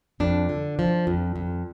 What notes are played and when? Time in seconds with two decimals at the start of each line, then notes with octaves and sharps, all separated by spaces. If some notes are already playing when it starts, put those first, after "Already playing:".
0.20 F2 D4
0.49 D3
0.79 F3
1.07 F2
1.36 F2